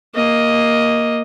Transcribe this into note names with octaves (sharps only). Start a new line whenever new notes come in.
A#3 D#5